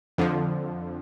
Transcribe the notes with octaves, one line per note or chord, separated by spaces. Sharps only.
F2 D3 F3